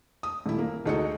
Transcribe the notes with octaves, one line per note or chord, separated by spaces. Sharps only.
D#6
D#1 E4
A#3
D2 G#3 D#4 F#4 A4 C#7